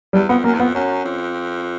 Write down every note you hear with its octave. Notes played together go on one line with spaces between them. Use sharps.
E2 G3
F2 B3
F#2 A#3
E2
F2 B3
F#2 C#4
F2